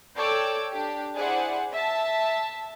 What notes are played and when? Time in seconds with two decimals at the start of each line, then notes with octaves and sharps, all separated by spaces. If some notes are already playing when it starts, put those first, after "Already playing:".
0.16 A4 C#5 D5 G5 D6 E6
0.72 D4 G4
1.15 E4 G#4 C5 D5 F#5
1.73 E5 A5